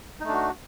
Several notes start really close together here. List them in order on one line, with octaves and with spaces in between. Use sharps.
D#4 A3 D4 F#4